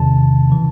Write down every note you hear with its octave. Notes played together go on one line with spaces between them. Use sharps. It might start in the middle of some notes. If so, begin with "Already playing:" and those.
Already playing: E2 C3 D#3 A5
C#3 E3